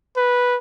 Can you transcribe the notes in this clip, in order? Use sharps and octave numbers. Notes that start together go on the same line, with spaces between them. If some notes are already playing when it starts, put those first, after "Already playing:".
B4